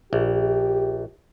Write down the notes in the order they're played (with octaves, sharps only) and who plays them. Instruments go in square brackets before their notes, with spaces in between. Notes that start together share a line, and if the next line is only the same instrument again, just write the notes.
[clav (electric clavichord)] A#1 [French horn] G4